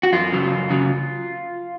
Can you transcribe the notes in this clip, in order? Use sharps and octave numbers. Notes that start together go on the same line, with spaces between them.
F#4
F#2 F4
C#3 F#3
F#2
C#3 F#3